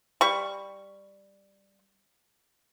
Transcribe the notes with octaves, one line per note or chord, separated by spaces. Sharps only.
G3 C#6